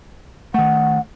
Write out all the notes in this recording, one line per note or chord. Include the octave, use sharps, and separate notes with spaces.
D#3 A3 F#5